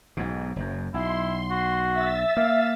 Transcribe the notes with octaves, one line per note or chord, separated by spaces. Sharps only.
B1 G#2 B2
F#1 F#2
B1 E4 C6
F#4
E5 E6 A6
A#3 F5